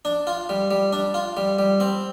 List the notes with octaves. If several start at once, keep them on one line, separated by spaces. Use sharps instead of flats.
D4
F4
G3
G3
D4
F4
G3
G3
C4